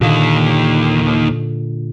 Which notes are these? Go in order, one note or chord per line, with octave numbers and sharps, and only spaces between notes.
D#2 A#2 D3 D#3